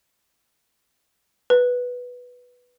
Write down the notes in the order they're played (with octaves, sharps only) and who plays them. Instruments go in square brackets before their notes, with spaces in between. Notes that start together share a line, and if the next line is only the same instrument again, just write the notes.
[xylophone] B4